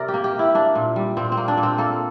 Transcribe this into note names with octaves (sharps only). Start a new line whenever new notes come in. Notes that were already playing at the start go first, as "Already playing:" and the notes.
Already playing: C3 G3 A#4 D5
G4
A#3
G4
C3
E4
A#3 D4
A#2
G3
A#2 C4
C4
A#3
D4
A#2
C4
A#3 A4